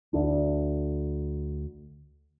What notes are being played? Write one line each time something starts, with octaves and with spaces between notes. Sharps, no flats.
D2 D4